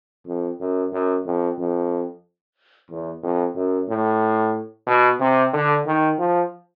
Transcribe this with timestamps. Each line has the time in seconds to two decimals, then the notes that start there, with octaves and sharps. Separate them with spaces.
0.27 F2
0.60 F#2
0.93 F#2
1.26 F2
1.58 F2
2.90 E2
3.23 F2
3.55 F#2
3.89 A2
4.87 B2
5.20 C3
5.53 D3
5.86 D#3
6.18 F3